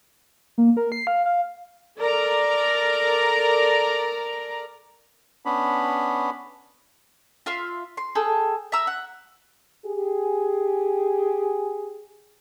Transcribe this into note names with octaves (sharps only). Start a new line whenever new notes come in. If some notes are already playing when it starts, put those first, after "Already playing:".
A#3
A#4
C7
F5
F5
A4 A#4 D5 A#5
B3 C#4 D4 B5
F4 E5 F5 C6
C6
G#4 A4 G5
E5 A#5 E6
F#5
G4 G#4